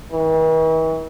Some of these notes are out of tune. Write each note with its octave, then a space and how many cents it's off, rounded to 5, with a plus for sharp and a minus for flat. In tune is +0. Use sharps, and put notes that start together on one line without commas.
E3 -45